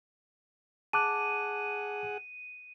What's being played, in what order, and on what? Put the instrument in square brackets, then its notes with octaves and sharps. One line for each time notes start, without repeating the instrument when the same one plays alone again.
[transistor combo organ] G#4 F#5 [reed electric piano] A5 D6 F#6 [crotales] D#7